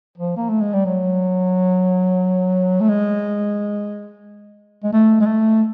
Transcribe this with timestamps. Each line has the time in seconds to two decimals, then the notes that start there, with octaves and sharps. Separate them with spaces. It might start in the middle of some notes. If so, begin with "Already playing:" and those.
0.18 F3
0.37 A#3
0.49 A3
0.61 G#3
0.73 G3
0.85 F#3
2.80 A3
2.89 G#3
4.84 G#3
4.93 A3
5.20 G#3
5.26 A3